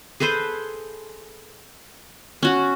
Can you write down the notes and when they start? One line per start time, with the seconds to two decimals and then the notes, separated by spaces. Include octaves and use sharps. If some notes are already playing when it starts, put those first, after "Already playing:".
0.20 G#4 A4 B4 C5
2.43 C#4 F#4 F#5